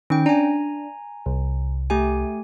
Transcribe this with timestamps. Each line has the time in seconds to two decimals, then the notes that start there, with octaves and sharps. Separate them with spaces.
0.10 D#3 C#4 G5
0.26 D4 G#5 A#5
1.26 C2
1.90 A3 G4 G#5